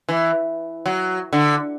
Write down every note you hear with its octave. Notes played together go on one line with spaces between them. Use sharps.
E3
F#3
D3